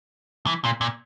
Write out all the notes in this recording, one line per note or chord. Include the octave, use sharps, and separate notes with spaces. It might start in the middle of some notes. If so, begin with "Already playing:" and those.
E3
A#2
A#2